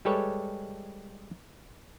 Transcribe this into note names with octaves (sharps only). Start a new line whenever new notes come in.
G3 G#3 G4 A4 B4 C#5